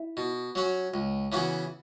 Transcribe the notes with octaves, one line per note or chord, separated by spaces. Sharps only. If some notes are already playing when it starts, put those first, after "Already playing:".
Already playing: E4
B2
F#3 C#4 F#4
C#2
C#3 E3 B3 F#4